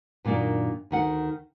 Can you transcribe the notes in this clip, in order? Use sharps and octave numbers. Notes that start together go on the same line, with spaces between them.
F#2 A#2 D#3 A#3 D4
D2 D#3 F#5